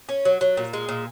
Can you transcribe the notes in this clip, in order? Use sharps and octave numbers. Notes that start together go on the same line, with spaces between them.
C#4
F#3
F#3
A#2
G#3
A#2